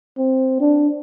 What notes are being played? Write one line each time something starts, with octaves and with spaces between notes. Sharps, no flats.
C4
D4